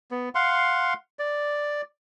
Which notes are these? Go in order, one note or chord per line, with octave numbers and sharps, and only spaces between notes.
B3
F5 F#5 C6
D5